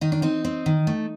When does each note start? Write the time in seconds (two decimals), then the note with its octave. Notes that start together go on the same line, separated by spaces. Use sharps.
0.01 D#3 D#4
0.12 D4
0.22 C4 D#4
0.45 C4
0.66 D#3
0.87 A3